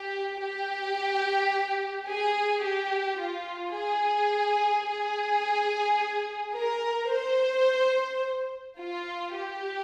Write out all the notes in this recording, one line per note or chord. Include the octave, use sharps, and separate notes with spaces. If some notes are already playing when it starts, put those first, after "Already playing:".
Already playing: G4
G4
G#4
G4
F4
G#4
G#4
A#4
C5
F4
G4